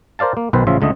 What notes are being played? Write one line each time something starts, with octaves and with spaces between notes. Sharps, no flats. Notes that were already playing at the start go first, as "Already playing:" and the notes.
A#4 C5 D5 F5 A5
A#3
B1 B2 D#3 B4 C5
A1 C#3 F3 F4 E5
C#2 D3 A3 D#5